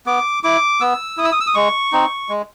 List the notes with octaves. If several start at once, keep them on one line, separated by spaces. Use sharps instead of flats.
B3 D6
E4 D6
B3 E6
E4 D#6
E6
D#6
E6
D#6
G#3 C#6
C4 D#4
G#3